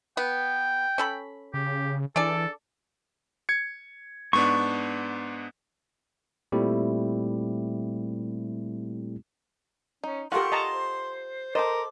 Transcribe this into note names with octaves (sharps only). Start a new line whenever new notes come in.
B3 G5
C#4 A4 B5
C#3 G4
E3 D4 G#4 A4 D5
G#6 C#7
G#2 B3 D4 C#6
A#2 G3 A3 C4 E4 G4
C#4 D#4
F4 G4 A4 A#4 F#5 C6 C#6
D#5 A5 A#5
C5
A4 A#4 C5 D#5 D6